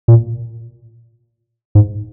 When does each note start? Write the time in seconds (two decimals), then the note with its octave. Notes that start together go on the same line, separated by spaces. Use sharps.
0.08 A#2
1.75 G#2